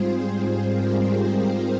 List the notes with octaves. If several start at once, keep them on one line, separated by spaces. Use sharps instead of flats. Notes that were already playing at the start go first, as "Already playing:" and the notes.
Already playing: G#2 G3 C4 F4 G#4 C5
G#4 C5
G4 A#4
G4